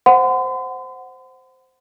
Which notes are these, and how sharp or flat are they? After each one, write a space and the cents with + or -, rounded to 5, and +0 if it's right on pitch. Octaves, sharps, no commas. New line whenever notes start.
C5 +0 F#5 +5 C6 -45